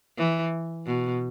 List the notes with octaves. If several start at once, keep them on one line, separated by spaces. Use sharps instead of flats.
E3
B2